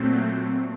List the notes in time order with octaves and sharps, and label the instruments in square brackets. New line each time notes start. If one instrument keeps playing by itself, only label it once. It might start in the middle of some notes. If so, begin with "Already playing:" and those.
Already playing: [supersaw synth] A#2 F#3 A3 C4